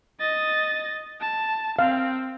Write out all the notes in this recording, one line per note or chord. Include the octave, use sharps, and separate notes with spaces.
D#5 A6
A5
C4 F5